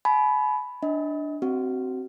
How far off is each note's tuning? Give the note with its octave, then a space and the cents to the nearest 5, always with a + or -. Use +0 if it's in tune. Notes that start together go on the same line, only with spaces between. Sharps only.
G#5 +45 B5 +0
D4 +0 D#5 +30
C4 +0 F#4 +30